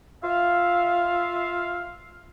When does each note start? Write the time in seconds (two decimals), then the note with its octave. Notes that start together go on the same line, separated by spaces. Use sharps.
0.23 F4 E5 F5